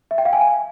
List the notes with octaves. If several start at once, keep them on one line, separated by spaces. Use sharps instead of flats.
E5
G5
F5
G#5